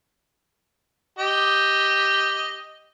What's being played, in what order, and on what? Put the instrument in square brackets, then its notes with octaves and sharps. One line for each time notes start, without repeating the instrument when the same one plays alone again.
[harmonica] G4 D#5